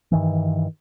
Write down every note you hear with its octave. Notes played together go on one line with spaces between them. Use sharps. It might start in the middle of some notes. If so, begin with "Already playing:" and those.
G2 D#3 E3